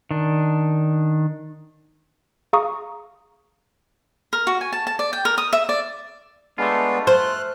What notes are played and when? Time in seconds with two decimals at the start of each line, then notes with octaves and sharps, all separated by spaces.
0.11 D#3 D4
2.53 G#4 F5 A#5 C#6 D#6
4.33 A#4
4.47 F#4
4.61 G#5
4.73 A5
4.87 A5
4.99 D5
5.13 G5
5.25 A#4
5.38 D#6
5.53 E5
5.69 D5
6.58 G#3 A3 B3 D4 F4
7.07 C5 F6 F#6